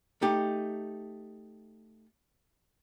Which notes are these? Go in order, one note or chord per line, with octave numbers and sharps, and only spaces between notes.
A3 D#4 G4